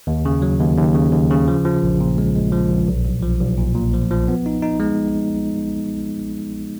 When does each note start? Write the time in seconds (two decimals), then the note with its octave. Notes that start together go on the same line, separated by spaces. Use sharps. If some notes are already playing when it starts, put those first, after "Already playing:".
0.07 D#2
0.25 C#3
0.42 F#3
0.60 D#2
0.78 D#2
0.95 C#3
1.13 D#2
1.30 C#3
1.48 F3
1.65 F3
1.83 A#1
2.00 A#2
2.18 G#3
2.35 G#3
2.52 F3
2.71 A#1
2.88 B1
3.05 B1
3.22 F3
3.40 B1
3.57 A#2
3.75 A#2
3.93 F3
4.11 F3
4.28 B3
4.46 D#4
4.62 D#4
4.80 G#3